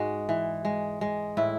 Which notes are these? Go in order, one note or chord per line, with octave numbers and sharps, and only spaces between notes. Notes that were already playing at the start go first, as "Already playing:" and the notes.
Already playing: G#2 G#3 F#4
E3
G#3
G#3
A2 E4